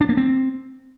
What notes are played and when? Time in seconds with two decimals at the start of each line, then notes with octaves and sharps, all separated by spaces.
0.01 D4
0.09 A#3
0.17 C4